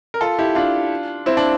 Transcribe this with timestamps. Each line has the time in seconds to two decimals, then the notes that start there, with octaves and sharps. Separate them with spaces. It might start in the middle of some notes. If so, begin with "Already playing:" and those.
0.14 A#4
0.21 F4 A4
0.38 E4 G4
0.55 D4 F4
1.26 C4 E4
1.37 D4